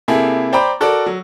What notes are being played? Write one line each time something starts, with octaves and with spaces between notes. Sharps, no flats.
C3 A#3 E4 G#4 A4
C5 D5 G5 A#5 B5 D6
F#4 A4 A#4 D5
F#3